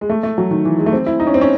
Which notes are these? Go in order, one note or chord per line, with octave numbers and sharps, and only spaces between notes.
G#3
A3
A3
F#3
D#3
E3
G#3
A3
C4
E4
D#4
C#4
C4
C#4